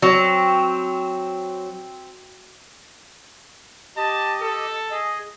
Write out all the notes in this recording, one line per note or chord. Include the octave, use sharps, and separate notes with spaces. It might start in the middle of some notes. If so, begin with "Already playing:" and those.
F#3 C4
G4 D#5 A5
A4
G#4 D#5